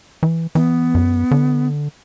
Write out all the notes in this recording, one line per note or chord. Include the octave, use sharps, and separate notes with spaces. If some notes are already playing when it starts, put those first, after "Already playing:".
E3
E3 B3
F#2
D3